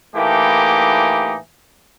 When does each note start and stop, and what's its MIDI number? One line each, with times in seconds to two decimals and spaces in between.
0.15 1.35 45
0.15 1.35 52
0.15 1.35 57
0.15 1.35 58
0.15 1.35 63
0.15 1.35 67